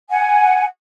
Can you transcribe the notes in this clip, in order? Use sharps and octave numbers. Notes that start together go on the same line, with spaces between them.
F#5 G#5